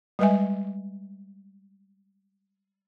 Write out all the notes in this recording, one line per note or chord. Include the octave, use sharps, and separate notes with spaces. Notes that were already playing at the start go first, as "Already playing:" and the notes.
G3 G#3 B4 D#5 E5 G#5